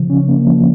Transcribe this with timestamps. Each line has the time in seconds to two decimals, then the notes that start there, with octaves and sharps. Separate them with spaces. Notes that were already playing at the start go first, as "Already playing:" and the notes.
Already playing: C#3 F3
0.10 C#4
0.28 A#3
0.47 F3